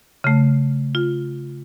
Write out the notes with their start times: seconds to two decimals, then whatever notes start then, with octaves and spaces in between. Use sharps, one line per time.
0.24 C#3 A3
0.95 F4